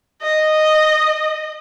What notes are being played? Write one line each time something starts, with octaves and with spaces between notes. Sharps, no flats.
D#5